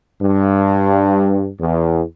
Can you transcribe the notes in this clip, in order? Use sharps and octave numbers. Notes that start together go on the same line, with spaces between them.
G2
E2